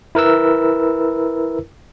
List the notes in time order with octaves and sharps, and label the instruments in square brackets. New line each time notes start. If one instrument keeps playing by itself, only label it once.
[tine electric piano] E4 A#4 B4 E6